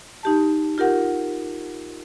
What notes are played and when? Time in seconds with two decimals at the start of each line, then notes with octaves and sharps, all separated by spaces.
0.23 D#4 G4 A5
0.78 F4 G4 A#4 F#5